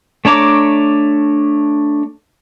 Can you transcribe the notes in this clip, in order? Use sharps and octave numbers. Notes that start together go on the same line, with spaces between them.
A3 D4 C#5 A#5 D6